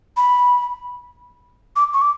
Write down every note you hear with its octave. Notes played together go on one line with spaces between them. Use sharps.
B5
D6
C#6
D6